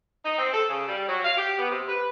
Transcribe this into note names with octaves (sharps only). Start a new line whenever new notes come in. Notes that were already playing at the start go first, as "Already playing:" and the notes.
D#4
C4
A4
C#3
G3
F#3
F5
G4
B3
C3
B4